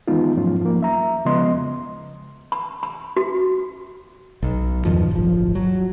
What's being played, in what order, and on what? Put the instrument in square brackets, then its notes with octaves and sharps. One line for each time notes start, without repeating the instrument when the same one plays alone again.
[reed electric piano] D#3 E3 G#3 B3 D#4 F4
G#2 F3 F#3 A3 C#4 F4
F3 A#3
E5 A#5
C#3 F3 G#3 B3 D#5 C6
[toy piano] B5
B5
F#4
[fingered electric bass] B1
E2 G2 D#3 F3
D1 G1 F3
F#3